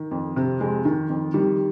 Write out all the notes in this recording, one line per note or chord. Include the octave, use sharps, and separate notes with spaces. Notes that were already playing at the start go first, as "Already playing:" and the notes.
Already playing: D#3
F2
C3
F2 G#3
D#3
F2
D#3 G3